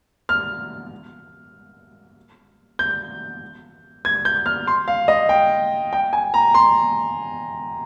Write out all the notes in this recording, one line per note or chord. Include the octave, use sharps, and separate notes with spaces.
F6
G6
G#6
G6
F6
C6
F5
D#5
G5
G5
G#5
A#5
C6